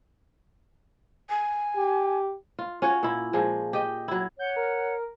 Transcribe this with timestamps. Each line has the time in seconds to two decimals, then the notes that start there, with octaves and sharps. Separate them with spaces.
1.29 G#5
1.76 G4
2.59 F4
2.82 C#4 F4 F#4 C#5
3.03 A#2 E4
3.33 A#2 F3 G#3
3.73 G4 D#5
4.08 F#3 E4
4.39 C#5 F#5 G6
4.56 A#4